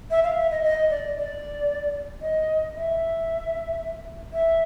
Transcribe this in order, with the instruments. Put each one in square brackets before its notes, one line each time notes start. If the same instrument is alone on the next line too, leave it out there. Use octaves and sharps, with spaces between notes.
[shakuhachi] E5
F5
E5
D#5
D#5
D5
D5
D#5
E5
E5